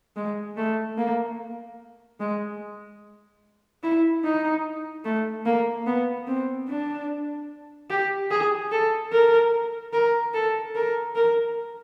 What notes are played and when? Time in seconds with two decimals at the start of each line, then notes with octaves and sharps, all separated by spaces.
0.16 G#3
0.57 A3
0.97 A#3
2.20 G#3
3.83 E4
4.24 D#4
5.05 A3
5.46 A#3
5.86 B3
6.27 C4
6.68 D4
7.90 G4
8.31 G#4
8.72 A4
9.12 A#4
9.93 A#4
10.34 A4
10.75 A#4
11.16 A#4